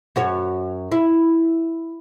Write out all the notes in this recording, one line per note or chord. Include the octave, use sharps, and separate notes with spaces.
F#2 F#4 C#5
E4